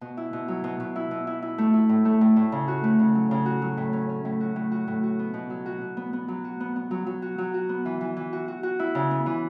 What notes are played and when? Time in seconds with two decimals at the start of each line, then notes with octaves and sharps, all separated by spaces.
0.01 B2
0.17 E4
0.33 B2
0.48 F#3
0.64 B2
0.80 B2
0.96 E4
1.11 B2
1.27 E4
1.42 E4
1.58 A3
1.74 E4
1.89 A2
2.05 A3
2.21 A2
2.36 A2
2.52 C#3
2.68 F#4
2.84 A3
2.99 C#3
3.15 F#3
3.31 C#3
3.46 F#4
3.62 F#3
3.77 A2
3.93 C#4
4.09 C#4
4.25 A2
4.40 F#4
4.56 A2
4.72 F#4
4.87 A2
5.03 F#4
5.19 B3
5.34 B2
5.50 F#3
5.66 F#4
5.81 B2
5.97 B3
6.13 B3
6.28 F#3
6.44 F#4
6.60 B3
6.76 B3
6.91 F#3
7.06 F#3
7.22 F#4
7.38 F#3
7.54 F#4
7.69 B3
7.85 E3
8.01 E3
8.17 E3
8.33 F#4
8.48 F#4
8.63 F#4
8.79 E4
8.95 C#3
9.11 B3
9.26 E3